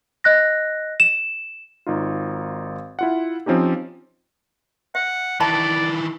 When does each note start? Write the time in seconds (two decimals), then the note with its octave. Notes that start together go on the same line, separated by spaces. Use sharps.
0.24 D#5 F#6 A#6
1.00 E7
1.86 G#1 D#4 F4
2.99 E4 F4 F#5
3.46 F3 C4 C#4 D#4 G4
4.95 E5 F#5
5.40 D#3 E3 D5 E5 A5 B5